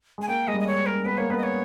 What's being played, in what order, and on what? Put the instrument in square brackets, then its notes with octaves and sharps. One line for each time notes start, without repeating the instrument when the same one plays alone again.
[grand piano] G#3 [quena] G#5
[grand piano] A#3 [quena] G5
[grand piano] G#3 [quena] D#5
[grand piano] G3
[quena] D#5
C#5
A#4
[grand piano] B3 [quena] B4
[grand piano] A#3 [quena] C#5
[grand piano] B3 [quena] B4
[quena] D#5
C#5